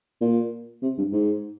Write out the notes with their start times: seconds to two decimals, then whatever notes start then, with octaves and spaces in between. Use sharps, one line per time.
0.21 A#2
0.82 C3
0.98 G2
1.12 G#2